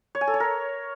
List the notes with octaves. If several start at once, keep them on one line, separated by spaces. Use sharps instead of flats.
C#5
G#5
A4
C#5
A#4